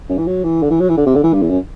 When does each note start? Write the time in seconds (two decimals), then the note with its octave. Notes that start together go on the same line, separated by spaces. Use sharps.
0.10 F#2
0.18 E3
0.26 F#3
0.44 E3
0.63 D3
0.70 E3
0.80 F#3
0.89 E3
0.97 D3
1.06 C3
1.15 D3
1.23 E3
1.33 G2
1.42 E2
1.50 F#2